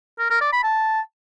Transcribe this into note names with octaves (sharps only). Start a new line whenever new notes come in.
A#4
A#4
D5
B5
A5